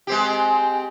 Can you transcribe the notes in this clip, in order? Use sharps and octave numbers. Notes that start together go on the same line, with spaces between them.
G#3 C4 G4